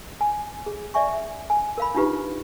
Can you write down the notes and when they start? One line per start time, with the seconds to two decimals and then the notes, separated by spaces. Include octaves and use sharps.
0.21 G#5
0.66 G#4
0.94 D5 E5 G#5 C#6
1.50 G#5
1.78 A#4 F5 B5
1.95 D4 D#4 F4 G4 B4